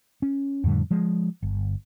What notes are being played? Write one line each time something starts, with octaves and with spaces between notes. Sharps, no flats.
C#4
F2 A2 D3 G3
F3 G#3
G1